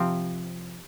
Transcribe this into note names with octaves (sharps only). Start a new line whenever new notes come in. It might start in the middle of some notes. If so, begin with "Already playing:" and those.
Already playing: C3 F3 C4